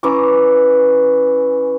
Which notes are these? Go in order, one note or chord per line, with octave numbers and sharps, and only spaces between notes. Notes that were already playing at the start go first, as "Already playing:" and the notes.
E3 C#4 A#5 D6